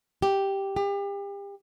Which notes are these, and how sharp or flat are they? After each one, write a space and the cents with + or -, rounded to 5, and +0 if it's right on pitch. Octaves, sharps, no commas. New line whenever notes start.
G4 +0
G4 +35